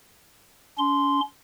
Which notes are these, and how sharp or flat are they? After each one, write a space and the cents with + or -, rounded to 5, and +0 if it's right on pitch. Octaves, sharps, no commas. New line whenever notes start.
C#4 +40 C6 -5